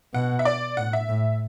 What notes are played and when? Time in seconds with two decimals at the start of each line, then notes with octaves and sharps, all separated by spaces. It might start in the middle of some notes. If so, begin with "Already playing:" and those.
0.14 B2 F#5
0.39 E5
0.45 D5
0.77 A2 F#5
0.93 E5
1.09 A2